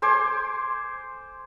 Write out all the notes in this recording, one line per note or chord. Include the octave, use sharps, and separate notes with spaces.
C5 G#5 C6 D6